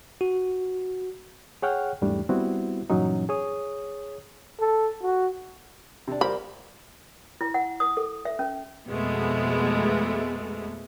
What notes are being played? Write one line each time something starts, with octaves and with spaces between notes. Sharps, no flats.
F#4
G#4 C#5 F#5 G5 F6
E2 G#2 E3 G3 A3 D4
G3 B3 C4 E4 F#4
G2 A#2 E3 F#3 C#4 D#4
G#4 C#5 D#6
A4
F#4
C3 D4
G3 A#4 C5 B5
E4
F#5
D#6
A4
E5
C#4
F2 B2 G#3 A3 B3